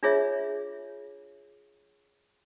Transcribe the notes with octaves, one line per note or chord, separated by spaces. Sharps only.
D4 F4 G#4 C#5 E5